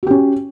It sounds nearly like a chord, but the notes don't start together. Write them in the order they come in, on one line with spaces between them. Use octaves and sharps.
F#4 G4 C#4